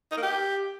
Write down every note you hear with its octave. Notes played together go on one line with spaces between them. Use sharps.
D#4
A#3
G4